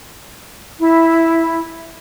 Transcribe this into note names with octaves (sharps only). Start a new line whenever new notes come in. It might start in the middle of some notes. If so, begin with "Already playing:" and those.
E4